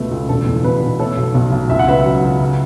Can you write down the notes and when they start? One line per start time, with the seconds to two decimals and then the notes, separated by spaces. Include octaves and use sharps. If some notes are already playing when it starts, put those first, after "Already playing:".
Already playing: C#2 B2 A3 B4
0.11 C#2
0.29 E1 A4
0.46 E2
0.64 B2 B4
0.82 B2
0.99 A3 A4 C#5
1.17 B1
1.35 B1
1.52 B1
1.70 C#2 E5
1.79 F#5
1.88 C#2 B4 E5
2.05 F#3
2.23 C#2
2.40 C#3